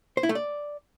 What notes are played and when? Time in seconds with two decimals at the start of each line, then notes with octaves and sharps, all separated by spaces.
0.17 C5
0.23 E4
0.29 A3
0.35 D5